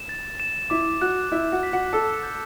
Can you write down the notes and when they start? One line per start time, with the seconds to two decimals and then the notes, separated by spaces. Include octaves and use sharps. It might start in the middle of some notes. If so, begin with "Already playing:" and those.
Already playing: E7
0.09 A6
0.40 E7
0.70 E4 E5 D6
1.01 F#4 F#5 F#6
1.32 E4 E5 G6
1.52 F#4 F#5
1.63 B6
1.72 F#4 F#5
1.93 A4 A5 E6
2.23 G6